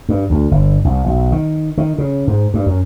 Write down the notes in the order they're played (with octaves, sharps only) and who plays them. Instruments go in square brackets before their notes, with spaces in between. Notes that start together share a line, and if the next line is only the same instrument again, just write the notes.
[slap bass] G2
D2
G1
C2
B1
D#3
D#3
C#3
G#2
G2
F#2